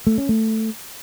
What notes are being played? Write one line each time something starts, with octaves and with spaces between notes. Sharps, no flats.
A3
C#4
A3